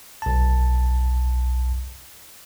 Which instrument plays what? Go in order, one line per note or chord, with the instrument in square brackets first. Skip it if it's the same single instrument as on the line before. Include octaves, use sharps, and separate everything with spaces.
[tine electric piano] B1 A5